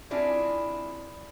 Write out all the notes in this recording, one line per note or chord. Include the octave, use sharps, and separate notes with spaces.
C4 D4 E4 F4 G#4